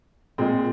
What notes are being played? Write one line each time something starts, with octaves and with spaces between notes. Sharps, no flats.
A#2 G#3 C4